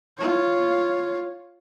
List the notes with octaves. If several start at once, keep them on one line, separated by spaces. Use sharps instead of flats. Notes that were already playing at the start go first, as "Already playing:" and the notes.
F4 C#5